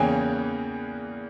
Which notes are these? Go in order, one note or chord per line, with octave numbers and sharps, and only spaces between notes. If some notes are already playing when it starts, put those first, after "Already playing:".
Already playing: E2 C#3 E3 A#3 C#4 G5 G#5